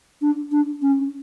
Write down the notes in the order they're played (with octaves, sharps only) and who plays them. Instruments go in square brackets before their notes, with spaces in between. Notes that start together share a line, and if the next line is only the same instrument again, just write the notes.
[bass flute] D4
D4
C#4